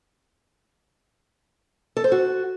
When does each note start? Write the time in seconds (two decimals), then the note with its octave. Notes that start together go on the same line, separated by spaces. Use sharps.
1.96 A4
2.04 C5
2.12 F#4